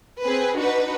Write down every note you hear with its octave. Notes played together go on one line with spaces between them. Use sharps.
C4 G#4 B4
D4 D#4 F#4 B4